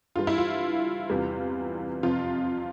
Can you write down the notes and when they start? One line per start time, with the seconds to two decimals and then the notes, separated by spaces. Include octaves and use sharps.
0.16 G2 E3 G3 F4
0.27 E4
0.38 F4
1.10 E2 C3 E3 G3
2.03 F2 C3 F3 F4